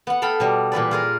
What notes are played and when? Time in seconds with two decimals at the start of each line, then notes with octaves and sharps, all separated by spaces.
0.07 B3 F#5
0.22 A4 F5 G5 B5
0.40 B2 G3
0.72 A#2 E3 B4 D5
0.91 F4 G#4 A#4